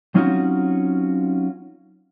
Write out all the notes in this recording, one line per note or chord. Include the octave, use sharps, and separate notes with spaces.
F#3 C4 C#4 D#4 F4 F#4